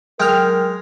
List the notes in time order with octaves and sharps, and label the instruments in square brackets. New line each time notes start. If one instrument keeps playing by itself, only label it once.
[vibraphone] F#3 [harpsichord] G#3 [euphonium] A#4 [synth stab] G5 F6